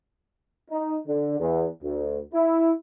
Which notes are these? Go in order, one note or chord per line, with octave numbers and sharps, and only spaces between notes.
D#4
D3
E2
D2
E4